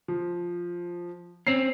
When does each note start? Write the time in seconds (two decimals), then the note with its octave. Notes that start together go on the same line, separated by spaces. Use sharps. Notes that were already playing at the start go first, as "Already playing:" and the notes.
0.08 F3
1.47 C4 C#4 C7 F7